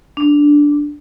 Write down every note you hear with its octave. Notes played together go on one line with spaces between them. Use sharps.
D4